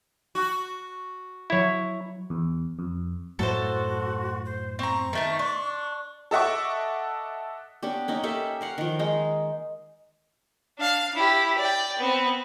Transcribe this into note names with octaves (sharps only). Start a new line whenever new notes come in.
F#4
F#3 E4 C#5 G#6
E2
F2
F#2 A2 F#4 A4 C5
C5
C4 A#5 C#6
D#3 A3 D#4
D4
A4 D#5 E5 F#5 C#6 D6
B3 C#4 D4 G4
A#3 C#4 D#4
A#3 G4 A4 E5
A#4 F5 F#5
D#3 F3
G#3 D#4
D4 F5
E4 G4
D5 G5
B3 C4